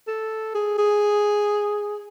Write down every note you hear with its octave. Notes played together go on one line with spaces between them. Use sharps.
A4
G#4
G#4